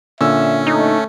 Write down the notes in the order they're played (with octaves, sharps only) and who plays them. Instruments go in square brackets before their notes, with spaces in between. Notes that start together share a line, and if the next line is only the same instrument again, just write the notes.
[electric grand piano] A#2 D3 E6 [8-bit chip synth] C#4 [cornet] E5
[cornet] A3 [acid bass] D#4